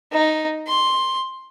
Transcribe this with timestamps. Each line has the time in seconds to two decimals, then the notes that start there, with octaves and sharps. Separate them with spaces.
0.12 D#4
0.67 C6